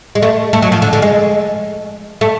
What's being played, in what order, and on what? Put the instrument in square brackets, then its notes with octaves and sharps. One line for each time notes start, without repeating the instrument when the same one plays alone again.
[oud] G#3
A3
A3
F#3
F3
D3
D3
G#3
A3